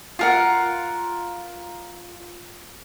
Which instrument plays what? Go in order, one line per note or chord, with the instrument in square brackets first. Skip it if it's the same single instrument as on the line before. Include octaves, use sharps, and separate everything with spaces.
[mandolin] F4 A#4 F#5